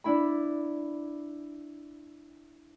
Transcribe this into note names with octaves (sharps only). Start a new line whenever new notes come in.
D4 E4 B5